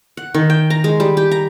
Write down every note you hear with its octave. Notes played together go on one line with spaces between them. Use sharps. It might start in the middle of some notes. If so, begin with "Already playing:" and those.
F#5
D#3
G5
A#5
G#3
G3
G4
A#5